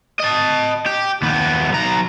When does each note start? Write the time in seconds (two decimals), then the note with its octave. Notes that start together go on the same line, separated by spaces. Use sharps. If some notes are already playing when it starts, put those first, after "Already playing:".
0.20 D#5 A5
0.86 G4
1.22 D#2 B3
1.70 B1 A#5